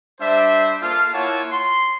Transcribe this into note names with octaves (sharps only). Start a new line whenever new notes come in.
G3 D4 C5 E5
A#3 F4 A4 F5
A#3 E4 F4 C#5 F#5 A5
C6